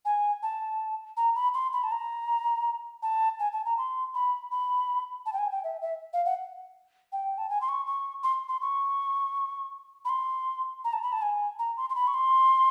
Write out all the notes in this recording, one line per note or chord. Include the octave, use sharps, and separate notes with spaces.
G#5
A5
A#5
B5
C6
B5
A5
A#5
A5
G#5
A5
A#5
C6
B5
B5
A5
G5
G#5
G5
E5
E5
F5
F#5
G5
A5
G#5
C6
C#6
C#6
C6
C6
C#6
B5
C6
A#5
A5
B5
A5
G#5
A#5
C6
C6
B5
C#6
C6